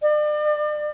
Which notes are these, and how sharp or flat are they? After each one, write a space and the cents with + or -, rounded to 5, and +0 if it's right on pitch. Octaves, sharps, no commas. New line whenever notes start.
D5 +40